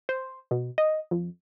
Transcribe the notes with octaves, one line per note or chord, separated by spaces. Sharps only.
C5
B2
D#5
F2